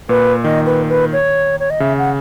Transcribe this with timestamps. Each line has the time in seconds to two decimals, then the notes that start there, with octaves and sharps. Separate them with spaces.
0.09 A#2 B4
0.44 D#3 D#5
0.66 B4
0.89 B4
1.13 C#5
1.60 C#5
1.70 D#5
1.80 C#3 E5
1.98 F#5